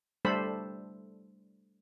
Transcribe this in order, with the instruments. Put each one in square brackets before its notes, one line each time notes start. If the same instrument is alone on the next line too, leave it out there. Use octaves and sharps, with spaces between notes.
[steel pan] G3 A3 D4 A4 C5 B5